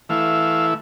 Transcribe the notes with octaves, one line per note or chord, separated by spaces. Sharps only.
E3 A3 E4 F5